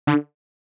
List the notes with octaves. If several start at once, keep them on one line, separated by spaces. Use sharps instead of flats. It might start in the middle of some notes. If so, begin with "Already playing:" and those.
D3